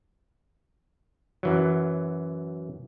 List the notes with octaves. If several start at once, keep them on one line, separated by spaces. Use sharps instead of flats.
F#2 E3 F#3